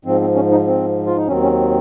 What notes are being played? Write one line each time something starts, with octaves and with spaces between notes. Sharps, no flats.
G#2 F3 C4
C4
C#4
D#4
C4
F4
D#4
D#2 D#3 F#3 C4 C#4
C#4